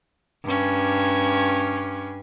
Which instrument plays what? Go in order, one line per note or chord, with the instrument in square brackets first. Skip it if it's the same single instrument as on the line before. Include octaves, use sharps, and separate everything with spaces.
[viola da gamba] G2 C#4